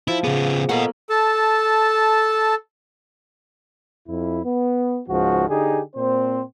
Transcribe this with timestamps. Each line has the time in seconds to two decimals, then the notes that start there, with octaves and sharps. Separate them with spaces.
0.08 F3 E4
0.24 C#3 B3 G#4
0.69 A#3 B3 A4 D#5 F#5
1.10 A4 A5
4.07 F2 E4
4.44 B3
5.08 C#2 G#2 F3 F#4
5.48 D3 D#4 G4 G#4
5.95 A#2 C4 C5